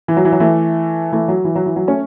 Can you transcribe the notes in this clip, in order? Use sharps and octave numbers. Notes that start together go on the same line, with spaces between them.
E3
F#3
E3
F#3
E3 A3
E3 A3
F#3
E3
F#3
E3
F#3
A3 C#4